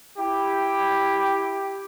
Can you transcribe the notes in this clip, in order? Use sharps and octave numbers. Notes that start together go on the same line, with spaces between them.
E4 G4